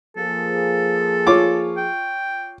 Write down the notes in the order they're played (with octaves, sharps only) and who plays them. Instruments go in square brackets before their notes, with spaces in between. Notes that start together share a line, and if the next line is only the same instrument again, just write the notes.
[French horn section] F3 A#3 G#4 [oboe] A4
[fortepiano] F4 C#5 D6
[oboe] G5